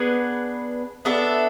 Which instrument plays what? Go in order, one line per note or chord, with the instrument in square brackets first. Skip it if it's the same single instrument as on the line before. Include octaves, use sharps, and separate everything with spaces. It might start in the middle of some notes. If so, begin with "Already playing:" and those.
Already playing: [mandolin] B3 D4 G#4 B4
B3 D4 A4 E5